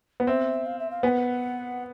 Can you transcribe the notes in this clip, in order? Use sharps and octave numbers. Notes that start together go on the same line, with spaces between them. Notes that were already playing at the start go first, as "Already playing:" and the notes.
B3
C4 E5
F5
E5
F5
B3 F#5 G#5